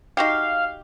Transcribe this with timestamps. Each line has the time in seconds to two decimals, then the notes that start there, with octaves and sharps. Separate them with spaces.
0.17 D#4 F#4 G4 F5